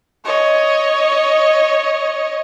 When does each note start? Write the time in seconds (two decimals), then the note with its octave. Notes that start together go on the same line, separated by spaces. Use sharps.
0.25 C#5 D#5